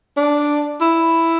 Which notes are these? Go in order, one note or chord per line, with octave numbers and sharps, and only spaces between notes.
D4
E4